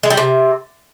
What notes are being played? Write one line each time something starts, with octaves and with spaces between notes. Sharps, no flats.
G#3
G3
C3